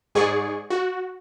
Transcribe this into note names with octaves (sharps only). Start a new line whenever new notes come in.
G#2 G#4 D5 G#5 C#6
F#4